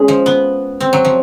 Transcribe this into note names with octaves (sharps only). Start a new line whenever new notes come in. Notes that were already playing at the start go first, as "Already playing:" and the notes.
Already playing: G#3 C#4
F3
B3
C4
F#3
F3